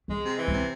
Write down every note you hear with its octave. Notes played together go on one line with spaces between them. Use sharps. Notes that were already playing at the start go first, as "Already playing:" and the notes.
F#3 G#3
C3
E3
F#3
C3